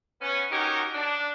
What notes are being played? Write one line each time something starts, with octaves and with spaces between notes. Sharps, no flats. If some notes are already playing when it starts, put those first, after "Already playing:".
B3 C#4
C#4 D#4 F#4 G4 A#4 C#5
D4